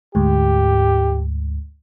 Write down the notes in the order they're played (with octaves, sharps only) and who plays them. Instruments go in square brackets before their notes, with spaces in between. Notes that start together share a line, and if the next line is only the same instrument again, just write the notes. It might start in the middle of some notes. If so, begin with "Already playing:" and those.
[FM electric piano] D2 G#2 [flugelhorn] G4